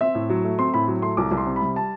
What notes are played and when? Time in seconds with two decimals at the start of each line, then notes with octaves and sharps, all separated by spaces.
0.01 C4 E5
0.15 A2
0.30 F#3
0.44 A3
0.59 C4 C6
0.74 A2 B5
0.88 F#3
1.02 A3 C6
1.17 C2 D6
1.31 C2
1.37 C6
1.46 C3
1.56 B5
1.62 G3
1.76 A5